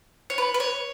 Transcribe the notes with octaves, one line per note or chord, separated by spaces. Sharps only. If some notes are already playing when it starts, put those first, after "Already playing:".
C#5
B4
B4
C#5